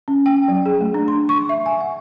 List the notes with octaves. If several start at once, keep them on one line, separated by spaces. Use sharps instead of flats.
C#4
G5
F#3
G#4
A3
D4
C6
C#6
E5
G#5
F#5